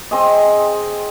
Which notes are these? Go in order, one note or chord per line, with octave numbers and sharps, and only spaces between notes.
C4 G#4 D#5